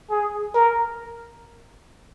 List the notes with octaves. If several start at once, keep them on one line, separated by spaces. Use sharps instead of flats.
G#4
A#4